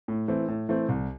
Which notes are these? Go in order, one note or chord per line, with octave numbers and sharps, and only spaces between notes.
A2
E3 A3 C4
A2
E3 A3 C4
C2